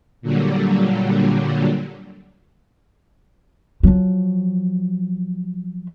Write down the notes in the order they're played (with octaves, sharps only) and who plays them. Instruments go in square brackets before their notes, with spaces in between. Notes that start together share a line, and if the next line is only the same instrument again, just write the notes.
[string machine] A#2 D3 F#3 G3
[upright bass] F3 F#3